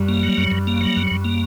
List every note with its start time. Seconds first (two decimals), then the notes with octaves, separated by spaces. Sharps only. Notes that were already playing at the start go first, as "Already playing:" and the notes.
Already playing: F#2 G3
0.09 A#3
0.23 F#3
0.37 F#2
0.51 F#2
0.67 A#3
0.81 F#3
0.96 F#2
1.11 F#2
1.25 A#3